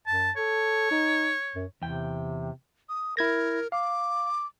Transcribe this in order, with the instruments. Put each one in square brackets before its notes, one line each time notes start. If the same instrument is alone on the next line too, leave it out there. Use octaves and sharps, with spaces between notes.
[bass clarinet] F#2 [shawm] A5
[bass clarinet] A4 [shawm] C#5
[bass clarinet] D#4
F#2
[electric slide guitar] E2 G5 [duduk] C3
[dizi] D#6
[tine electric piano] E4 G#6 A#6 [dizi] A#4
[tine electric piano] F5 [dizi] D6